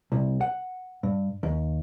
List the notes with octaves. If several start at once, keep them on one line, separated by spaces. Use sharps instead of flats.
C2
F#5
G2
D#2